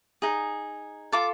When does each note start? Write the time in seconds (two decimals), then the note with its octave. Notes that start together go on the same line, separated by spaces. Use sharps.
0.22 D#4 G#4
1.12 F4 A4 D6